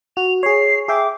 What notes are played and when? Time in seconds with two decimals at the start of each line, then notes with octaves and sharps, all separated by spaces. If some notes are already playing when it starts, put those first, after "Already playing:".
0.17 F#4 F7
0.43 G#4 C#5 C7
0.88 G#4 E5 G5 D6